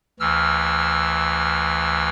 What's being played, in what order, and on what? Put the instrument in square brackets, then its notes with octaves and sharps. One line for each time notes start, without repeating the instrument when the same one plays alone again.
[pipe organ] D2 E3 E6 F6